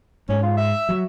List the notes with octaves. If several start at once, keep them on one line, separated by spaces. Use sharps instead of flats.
G#2 C#4
F4
E5
F#3